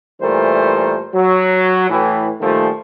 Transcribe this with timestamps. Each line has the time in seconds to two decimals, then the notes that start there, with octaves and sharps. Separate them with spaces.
0.21 A#2 E3 G3 A3 A#4 C5
1.14 F#3
1.90 A2 E3
2.40 A#2 D#3 F3 G3 A3